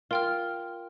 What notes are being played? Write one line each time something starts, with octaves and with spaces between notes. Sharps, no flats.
F4 A#4 G5 F6